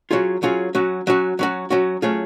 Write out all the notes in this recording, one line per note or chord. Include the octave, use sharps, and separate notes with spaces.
F#3 C#4 F4 G#4
F#3 C#4 F4 G#4
F#3 C#4 F#4
F#3 C#4 F#4
F#3 C#4 F#4
F#3 C#4 F#4
F#3 A3 C#4 F4 G#4